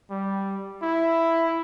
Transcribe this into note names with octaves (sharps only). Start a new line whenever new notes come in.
G3
E4